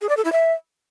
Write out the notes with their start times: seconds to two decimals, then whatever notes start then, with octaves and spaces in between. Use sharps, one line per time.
0.01 G#4
0.09 D5
0.17 A4
0.25 E4
0.32 E5